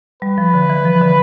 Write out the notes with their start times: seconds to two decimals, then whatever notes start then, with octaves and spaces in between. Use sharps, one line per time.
0.22 G3 B4
0.38 F3
0.54 D3
0.70 E3
0.85 F3
1.01 D3